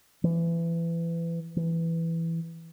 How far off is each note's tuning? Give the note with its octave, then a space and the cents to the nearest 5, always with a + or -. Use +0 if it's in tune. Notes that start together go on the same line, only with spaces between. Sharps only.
E3 +25
E3 +5